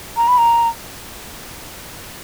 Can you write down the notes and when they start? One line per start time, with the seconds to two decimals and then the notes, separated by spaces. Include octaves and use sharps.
0.17 A#5
0.28 B5
0.38 A#5